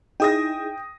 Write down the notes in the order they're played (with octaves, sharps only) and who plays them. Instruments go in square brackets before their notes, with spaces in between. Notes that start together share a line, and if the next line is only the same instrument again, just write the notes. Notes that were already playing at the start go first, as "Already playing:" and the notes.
[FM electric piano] D#4 E4 G#4 [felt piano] G5 D#6 A#6